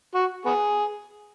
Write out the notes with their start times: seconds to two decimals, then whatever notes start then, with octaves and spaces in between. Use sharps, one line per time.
0.14 F#4
0.46 B3 G#4